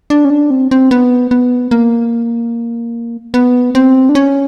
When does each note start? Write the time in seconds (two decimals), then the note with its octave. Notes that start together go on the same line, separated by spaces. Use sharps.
0.10 D4
0.25 C#4
0.30 D4
0.50 C4
0.71 C4
0.91 B3
1.31 B3
1.71 A#3
3.34 B3
3.75 C4
4.09 D4
4.15 C#4